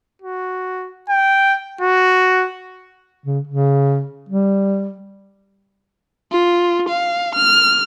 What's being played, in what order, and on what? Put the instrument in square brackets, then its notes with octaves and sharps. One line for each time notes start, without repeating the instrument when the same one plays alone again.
[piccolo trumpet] F#4
G5
F#4
[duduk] C#3
C#3
G3
[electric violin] F4
F5
F6